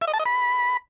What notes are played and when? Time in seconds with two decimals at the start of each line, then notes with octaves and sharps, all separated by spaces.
0.02 E5
0.08 D#5
0.14 A5
0.20 D#5
0.26 B5